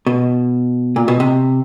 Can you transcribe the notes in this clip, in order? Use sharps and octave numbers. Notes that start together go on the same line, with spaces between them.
B2
A#2
B2
C3